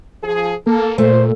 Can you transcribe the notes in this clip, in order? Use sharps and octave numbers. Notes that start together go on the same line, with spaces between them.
F3 G#4
A#3 A4
A#2 A3 C5